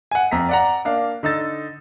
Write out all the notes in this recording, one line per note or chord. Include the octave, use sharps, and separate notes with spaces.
F#5 G#5
F2 A#5 B6
D5 F#5 A#5
A#3 D4 F5
D3 D#4 E6 A6